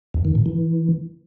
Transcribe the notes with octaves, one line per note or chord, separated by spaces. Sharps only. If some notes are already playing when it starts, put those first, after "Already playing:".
E2
D#3
A2
E3